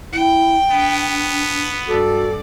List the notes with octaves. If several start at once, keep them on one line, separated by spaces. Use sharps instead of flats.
E4 G5
B3 D4
G2 F#4 A4 D5